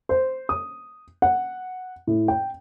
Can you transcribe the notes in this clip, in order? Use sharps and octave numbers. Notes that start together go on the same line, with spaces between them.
C5
D#6
F#5
A2
G5